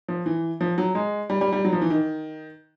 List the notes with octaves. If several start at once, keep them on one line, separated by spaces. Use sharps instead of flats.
F3
E3
F3
F#3
G#3
G3
G3
G3
F#3
F3
E3
D#3